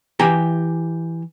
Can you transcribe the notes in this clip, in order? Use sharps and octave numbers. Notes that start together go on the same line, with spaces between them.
E3 G4 G#5 A#5